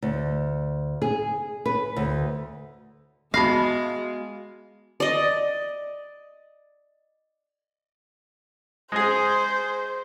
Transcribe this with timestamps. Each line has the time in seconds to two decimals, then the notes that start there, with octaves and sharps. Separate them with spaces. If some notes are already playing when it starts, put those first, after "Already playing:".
0.02 D2
1.02 G#4
1.66 B4
1.96 D2
3.34 G#3 B3 F#4 F5 A5 B5 A#6
5.00 D5 D#5
8.92 G#3 G#4 C5